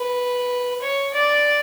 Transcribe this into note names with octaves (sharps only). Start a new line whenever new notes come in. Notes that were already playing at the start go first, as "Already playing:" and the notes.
Already playing: B4
C#5
D5